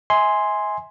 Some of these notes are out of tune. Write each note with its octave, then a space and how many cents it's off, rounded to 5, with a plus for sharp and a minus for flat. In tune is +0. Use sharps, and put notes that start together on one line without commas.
E5 -45 G#5 +0 C6 +0